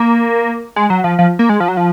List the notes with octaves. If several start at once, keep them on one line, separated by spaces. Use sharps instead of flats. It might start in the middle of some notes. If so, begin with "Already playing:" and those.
Already playing: A#3
G#3
F#3
F3
F3
A#3
G#3
F3
F#3
F3